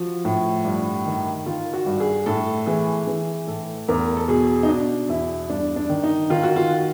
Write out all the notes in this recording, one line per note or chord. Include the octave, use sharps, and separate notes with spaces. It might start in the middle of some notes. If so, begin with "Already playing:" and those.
Already playing: F3 F#4
A2
G2
D#3
D#3 F4
F#4
G2
G#4
A2 A4
E3 G#4
E3 G#4
A2 A4
E2 A#4
A4
B2 G#4
D#4
B2 D4
E2 E4
G2 D4
D4
D#3
D#4
D#3 F4
F#4
F4
F#4